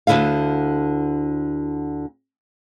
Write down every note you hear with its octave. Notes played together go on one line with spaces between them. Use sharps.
D2 A#2 D3 E4 F5